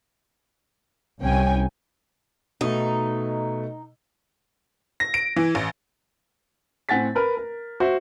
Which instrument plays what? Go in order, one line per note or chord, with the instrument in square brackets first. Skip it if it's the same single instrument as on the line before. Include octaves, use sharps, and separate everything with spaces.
[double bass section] C2 [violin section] C#4 G5 G#5
[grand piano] B2 A3 [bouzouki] D#4
[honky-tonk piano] A#6
D7
E3
A1
[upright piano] A2 C4 F#5 G#5 A6 B6
A#4 B4 A#5
A#4
F#4 C5 E5